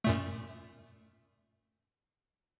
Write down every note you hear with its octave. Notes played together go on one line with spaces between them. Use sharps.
F#2 A#2 A3